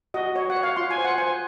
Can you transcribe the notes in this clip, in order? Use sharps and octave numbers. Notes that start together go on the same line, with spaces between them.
F#4 D#5
F#4 C#5
F#5
C#5
F5
F4 C6
G#5
C5
F#5
C5 G#5